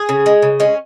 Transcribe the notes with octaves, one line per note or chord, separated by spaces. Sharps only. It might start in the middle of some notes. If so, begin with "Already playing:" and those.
Already playing: G#4
C#3
G#3
C#3
G#3 C#4